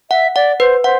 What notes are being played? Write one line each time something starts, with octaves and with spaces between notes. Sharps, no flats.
E5 F#5
D5 F#5
B4 C5
C5 F#5